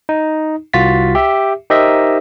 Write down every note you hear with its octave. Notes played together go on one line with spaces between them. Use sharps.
D#4
C2 F4 F#4 A6 B6
G4 E5
D#4 G4 A#4 C5 D#5 E5